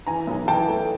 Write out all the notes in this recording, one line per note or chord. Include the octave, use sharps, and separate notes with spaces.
E3 G#5 A#5
B1
E3 G5 A5
A3